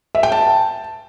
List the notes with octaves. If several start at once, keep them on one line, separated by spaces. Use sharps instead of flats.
E5
G5
A5